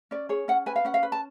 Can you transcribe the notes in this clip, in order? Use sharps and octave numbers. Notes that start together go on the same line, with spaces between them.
C#4 D5
G#4 C#5
C#4 F#5
B4 G#5
F5
C#4 F#5
F5
B4
A5